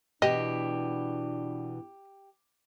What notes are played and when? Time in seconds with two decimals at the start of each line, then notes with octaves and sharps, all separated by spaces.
0.22 B2 E3 D4 G4 D#5